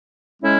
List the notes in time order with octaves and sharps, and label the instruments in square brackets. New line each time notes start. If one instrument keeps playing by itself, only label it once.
[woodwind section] A2 G#3 C#4 E4